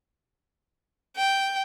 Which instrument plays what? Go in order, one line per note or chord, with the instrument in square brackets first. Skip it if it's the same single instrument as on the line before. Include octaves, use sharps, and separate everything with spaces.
[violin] G5